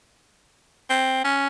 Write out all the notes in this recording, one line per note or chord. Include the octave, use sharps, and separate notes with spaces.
C4
C#4